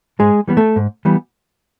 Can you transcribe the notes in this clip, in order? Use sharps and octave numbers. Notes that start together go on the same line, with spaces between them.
G#2 G#3 G#4
E3 G3 B3
A3 A4
G#2
E3 G3 B3